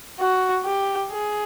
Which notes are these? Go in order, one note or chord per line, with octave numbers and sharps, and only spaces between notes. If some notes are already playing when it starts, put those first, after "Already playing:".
F#4
G4
G#4